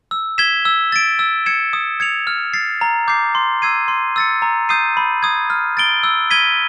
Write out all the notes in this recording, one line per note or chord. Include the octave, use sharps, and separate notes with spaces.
E6
G#6 B6 E7 G7
E6
A6 D7
E6
G#6 C#7 E7
D#6
G#6 C#7 F7
F6
A6 C7
A#5
D6 G6 C7
C6
E6 G#6 C7 D#7
C6
E6 A6 C#7
A#5
D#6 G6 C7 D#7
B5
D#6 G#6
F6
A6 D7 G7
E6
G#6 B6 D#7 G7